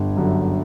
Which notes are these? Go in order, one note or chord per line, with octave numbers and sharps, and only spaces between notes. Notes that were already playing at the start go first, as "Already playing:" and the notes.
Already playing: G1
F#2 D3